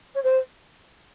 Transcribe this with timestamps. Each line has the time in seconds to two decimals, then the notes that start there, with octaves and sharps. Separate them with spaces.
0.15 C#5
0.23 C5